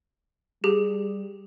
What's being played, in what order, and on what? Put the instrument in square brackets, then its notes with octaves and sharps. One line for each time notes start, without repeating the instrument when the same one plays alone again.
[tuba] G3 [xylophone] G4 G#4